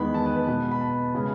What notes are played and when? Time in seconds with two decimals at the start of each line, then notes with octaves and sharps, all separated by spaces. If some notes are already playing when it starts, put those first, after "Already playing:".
Already playing: E2 D#3 G#3 B3 B5
0.14 A5
0.26 B4
0.36 B4
0.47 B2 G#3 B3 B4
0.71 B5
0.81 A5
1.15 C#3 G#3